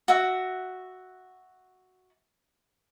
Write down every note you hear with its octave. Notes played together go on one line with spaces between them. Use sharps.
F#4 E5